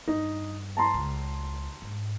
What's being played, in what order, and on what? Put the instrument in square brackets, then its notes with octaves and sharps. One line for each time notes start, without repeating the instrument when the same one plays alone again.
[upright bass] G2 [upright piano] D#4
[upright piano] A5 A#5 C6
[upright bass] C#2
G#2